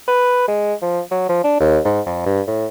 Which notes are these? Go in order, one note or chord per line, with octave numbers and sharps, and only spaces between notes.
B4
G#3
F3
F#3
F3
D4
D#2
G#2
F2
G2
A2